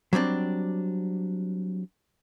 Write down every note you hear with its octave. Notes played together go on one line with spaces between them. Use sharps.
F#3 G3 C4 D4